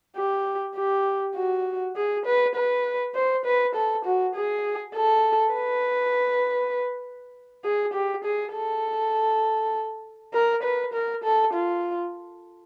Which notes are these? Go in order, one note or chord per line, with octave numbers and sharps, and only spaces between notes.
G4
G4
F#4
G#4
B4
B4
C5
B4
A4
F#4
G#4
A4
B4
G#4
G4
G#4
A4
A#4
B4
A#4
A4
F4